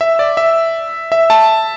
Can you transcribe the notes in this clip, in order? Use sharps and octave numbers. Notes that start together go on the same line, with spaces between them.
E5
D5
E5
E5
A5